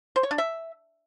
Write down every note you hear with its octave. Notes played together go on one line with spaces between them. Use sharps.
C5
C#5
D4
E5